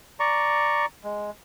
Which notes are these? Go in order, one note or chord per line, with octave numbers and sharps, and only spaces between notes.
D5 A#5 C#6
G#3